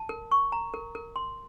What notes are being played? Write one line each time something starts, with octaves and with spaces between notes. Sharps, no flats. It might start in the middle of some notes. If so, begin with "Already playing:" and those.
Already playing: A5
A#4
C#6
A#5
A#4
A#4
C6